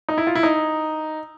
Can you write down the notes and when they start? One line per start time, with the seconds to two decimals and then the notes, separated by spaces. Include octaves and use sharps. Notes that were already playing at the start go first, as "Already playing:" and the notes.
0.09 D#4
0.18 E4
0.27 F4
0.35 E4
0.43 D#4